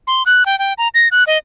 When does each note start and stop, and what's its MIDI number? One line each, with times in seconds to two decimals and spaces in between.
0.07 0.23 84
0.26 0.43 90
0.46 0.58 79
0.59 0.73 79
0.78 0.88 82
0.95 1.08 94
1.12 1.24 90
1.27 1.38 75